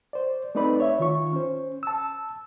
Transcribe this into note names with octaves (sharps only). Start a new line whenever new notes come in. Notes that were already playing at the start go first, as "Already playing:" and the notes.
C5 D5
A3 C4 D#4 B4 D5 B5
C#5 E5
D#3 F4 C#6
C#4 C5
A5 E6